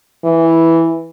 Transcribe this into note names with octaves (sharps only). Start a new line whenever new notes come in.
E3